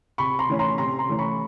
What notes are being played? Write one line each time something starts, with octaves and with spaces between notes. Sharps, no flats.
C3 B5 C#6
A#5 C6
E3 A3 C#4
A#5 C6
C3 A#5 C6
A#5 C6
E3 A3 C#4
B5 C#6